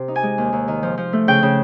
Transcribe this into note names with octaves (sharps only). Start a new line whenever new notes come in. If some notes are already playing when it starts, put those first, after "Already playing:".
Already playing: C3
D#4
G#5
G#3
D#2
D#2
D#3
F3
F3
A3
C#3 G5
C#3